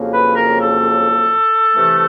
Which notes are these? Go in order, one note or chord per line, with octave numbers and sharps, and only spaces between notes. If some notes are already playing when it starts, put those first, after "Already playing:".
Already playing: F2 C#3 F#3 A#3
B4
A#4
A4
C3 E3 A3